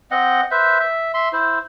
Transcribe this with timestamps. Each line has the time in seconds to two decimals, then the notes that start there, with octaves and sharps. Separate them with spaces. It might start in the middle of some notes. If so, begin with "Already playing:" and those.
0.11 C4 D#5 F#5
0.51 B4 C5 E5
0.79 E5
1.14 E5 C6
1.33 E4 C5